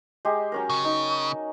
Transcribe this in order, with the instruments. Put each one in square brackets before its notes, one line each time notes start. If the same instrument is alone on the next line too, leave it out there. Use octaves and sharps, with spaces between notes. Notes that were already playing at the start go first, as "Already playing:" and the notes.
[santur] G#3 G4
F#3 C#4 A#4
[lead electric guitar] C#3
[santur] D#4